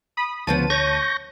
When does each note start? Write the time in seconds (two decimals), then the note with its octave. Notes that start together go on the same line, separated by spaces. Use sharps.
0.17 B5 D#6
0.47 D2 C#3 F3 B3 A5 D#7
0.70 C#5 C#6 G6 A#6